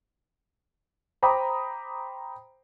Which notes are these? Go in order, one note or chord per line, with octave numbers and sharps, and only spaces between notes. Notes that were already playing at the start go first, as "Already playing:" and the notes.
C5 G5 A#5 B5 D6 D#6